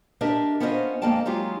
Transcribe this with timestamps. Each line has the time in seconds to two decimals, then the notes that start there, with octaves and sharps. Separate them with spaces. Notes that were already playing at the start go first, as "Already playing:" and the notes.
0.21 D4 G4 A#4 D#5 E5
0.60 B3 C#4 F4 C5 C#5 D#5
1.02 F2 G#3 A#3 D#5 G5 A5
1.25 F#3 G#3 D#4 F4 G4